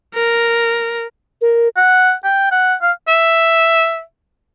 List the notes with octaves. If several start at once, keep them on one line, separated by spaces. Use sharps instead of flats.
A#4
A#4
F#5
G5
F#5
F5
E5